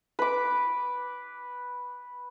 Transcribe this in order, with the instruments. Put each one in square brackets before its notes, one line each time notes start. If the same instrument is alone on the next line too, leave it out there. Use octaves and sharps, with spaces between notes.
[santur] B4 D6